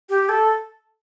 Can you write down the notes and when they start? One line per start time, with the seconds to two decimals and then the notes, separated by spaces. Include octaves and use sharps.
0.09 G4
0.29 A4